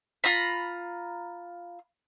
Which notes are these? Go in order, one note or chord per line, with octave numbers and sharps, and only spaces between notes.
F4 A#5 B5